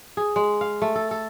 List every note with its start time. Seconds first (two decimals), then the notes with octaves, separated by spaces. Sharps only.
0.17 G#4
0.36 G#3
0.61 F5
0.82 A3
0.95 A4
1.11 A4